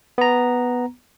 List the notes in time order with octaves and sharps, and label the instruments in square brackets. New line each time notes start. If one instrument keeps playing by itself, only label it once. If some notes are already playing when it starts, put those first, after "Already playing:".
[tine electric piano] B3 A#5